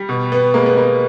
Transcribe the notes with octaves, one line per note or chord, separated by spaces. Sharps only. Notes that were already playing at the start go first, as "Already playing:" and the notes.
Already playing: G3
B2
B3
G#3 A#3
B3
A#3